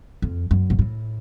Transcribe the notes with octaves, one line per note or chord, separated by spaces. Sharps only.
F2
F#2
A#2
A2